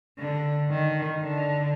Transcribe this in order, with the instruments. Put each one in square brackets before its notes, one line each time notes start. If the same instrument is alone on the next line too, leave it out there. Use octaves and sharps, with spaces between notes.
[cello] D3
D#3
D3